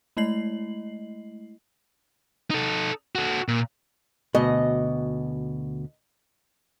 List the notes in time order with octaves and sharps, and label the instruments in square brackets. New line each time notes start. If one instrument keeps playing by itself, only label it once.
[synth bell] G#3 A3 E4 D#5 C7 F#7
[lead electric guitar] D#4 A4
F#4 A4
A#2
[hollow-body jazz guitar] D2 B2 [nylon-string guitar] D#5